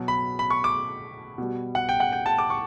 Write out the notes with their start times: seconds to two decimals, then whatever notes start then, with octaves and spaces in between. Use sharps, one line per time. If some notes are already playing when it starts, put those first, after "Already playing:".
Already playing: B2 F#3
0.08 B5
0.39 B5
0.50 C#6
0.64 D6
1.38 B2 G3
1.75 F#5
1.89 G5
2.00 F#5
2.12 G5
2.26 A5
2.38 D6
2.50 C#6